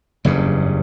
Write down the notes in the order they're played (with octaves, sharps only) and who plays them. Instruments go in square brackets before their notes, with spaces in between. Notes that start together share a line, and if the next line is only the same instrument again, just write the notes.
[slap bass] F#1 E2 G2 C#3